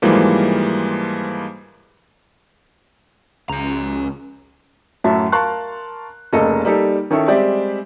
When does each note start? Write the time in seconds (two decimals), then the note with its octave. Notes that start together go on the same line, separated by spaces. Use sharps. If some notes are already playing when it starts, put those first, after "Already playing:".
0.02 G#2 E3 F3 G3 G#3 A#3
3.49 C#2 C#4 A#5
5.04 F#2 A2 F#3 E5 A5
5.32 A#4 F5 A5 C6 C#6 F#6
6.33 F1 C#3 A#3 A4 D#5
6.65 G3 A#3 D#4 G4 A4
7.11 D#3 C#4 E4 A4
7.28 G3 G#3 C4 G4 D5 E5